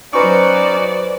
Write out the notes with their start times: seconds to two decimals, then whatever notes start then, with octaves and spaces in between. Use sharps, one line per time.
0.13 F#3 C#4 D#4 F#4 B4 C5 D5 C#6